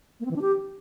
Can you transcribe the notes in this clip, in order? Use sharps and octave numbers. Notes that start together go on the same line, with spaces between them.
A#3
C4
E3
D4
G4